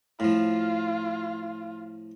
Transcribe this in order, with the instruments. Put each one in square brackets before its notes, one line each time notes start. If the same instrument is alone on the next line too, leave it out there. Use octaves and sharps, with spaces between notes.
[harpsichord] A2 F3 [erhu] F4